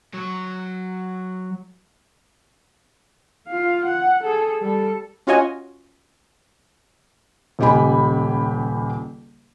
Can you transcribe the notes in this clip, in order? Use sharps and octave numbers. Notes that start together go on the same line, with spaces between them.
F#3 C#5
F4 F5
F#5
G#4 A4
G3 A4
C#4 F4 F#4 C#5 D#5 G#5
D#1 C#2 G4 D#5 G#5 B5